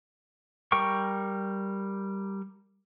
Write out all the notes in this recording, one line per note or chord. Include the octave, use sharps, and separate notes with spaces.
G3 A#4 G5 C#6